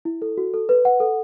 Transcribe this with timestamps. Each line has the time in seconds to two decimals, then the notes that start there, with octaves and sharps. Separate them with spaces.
0.05 E4
0.22 A4
0.37 F#4
0.54 A4
0.69 B4
0.85 F#5
1.00 A4